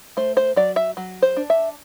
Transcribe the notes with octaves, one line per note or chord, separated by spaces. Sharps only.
A3 C5
C5
F#3 D5
E5
F#3
C5
D4
E5